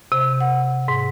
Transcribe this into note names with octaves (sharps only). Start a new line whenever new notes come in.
C3
F#5
G#2